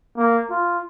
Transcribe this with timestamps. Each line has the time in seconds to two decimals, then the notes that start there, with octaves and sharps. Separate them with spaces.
0.18 A#3
0.50 F4